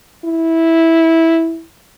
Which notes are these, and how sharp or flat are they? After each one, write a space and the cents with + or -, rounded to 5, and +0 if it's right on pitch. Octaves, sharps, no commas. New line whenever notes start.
E4 -10